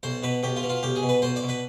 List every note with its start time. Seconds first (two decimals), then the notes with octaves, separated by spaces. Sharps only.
0.03 B1 C5
0.23 B2 B4
0.43 B1 G4
0.56 F4
0.63 B2
0.69 F4
0.83 B1 G4
0.96 G#4
1.03 B2
1.09 B4
1.22 B1 C5
1.36 D5
1.43 B2
1.49 B4